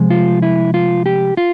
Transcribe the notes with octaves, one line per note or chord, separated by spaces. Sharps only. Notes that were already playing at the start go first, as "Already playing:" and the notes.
Already playing: C3 F3 G#3
F4
E4
F4
G4
F4